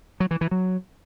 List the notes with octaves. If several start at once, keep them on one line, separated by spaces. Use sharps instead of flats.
F#3
E3
E3
F#3